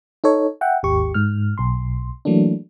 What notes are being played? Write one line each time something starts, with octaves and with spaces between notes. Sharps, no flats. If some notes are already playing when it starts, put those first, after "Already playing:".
D#4 A4 C#5
E5 F#5 G5
G#1 D#2 G4 C#6
G#2 F6
B1 C6
E3 F#3 A3 A#3 D4